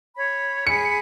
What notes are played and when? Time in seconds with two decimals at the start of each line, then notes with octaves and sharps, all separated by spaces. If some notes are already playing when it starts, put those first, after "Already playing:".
0.17 C#5 B5
0.67 G#4 B5 C#7